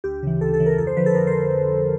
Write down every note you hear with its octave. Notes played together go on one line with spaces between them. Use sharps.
D2 G4
C#3 E3
D2 A4
A4
C#3 E3
A#4
F2 A4
C5
D3 F3 B4
A4
F2 A#4
C5